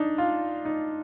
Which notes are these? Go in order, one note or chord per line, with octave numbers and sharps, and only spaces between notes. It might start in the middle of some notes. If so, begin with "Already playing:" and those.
Already playing: D4 D#4
F4
D#4